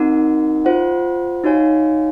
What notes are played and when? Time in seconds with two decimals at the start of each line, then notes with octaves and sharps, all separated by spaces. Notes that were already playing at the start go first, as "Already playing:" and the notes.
Already playing: C4 D#4 F#4 A#4
0.65 F4 C5 F#5
1.44 D#4 F#4 C#5 F5 G#5